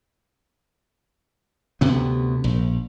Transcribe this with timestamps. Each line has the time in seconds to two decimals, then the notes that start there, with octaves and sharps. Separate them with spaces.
1.81 D2 C3 B3
2.44 A#1